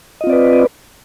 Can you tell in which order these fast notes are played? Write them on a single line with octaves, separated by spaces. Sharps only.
D#5 F4 C4 D5 B4